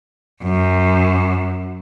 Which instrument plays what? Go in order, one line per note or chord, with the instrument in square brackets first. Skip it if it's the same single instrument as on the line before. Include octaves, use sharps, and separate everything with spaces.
[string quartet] F#2